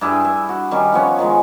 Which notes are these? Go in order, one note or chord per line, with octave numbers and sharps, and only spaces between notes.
G2 E4 G#4 G5
E5
F#4
D#3 G3 C#4
F3 B3 C#4 C#5
D#3 F3 G#3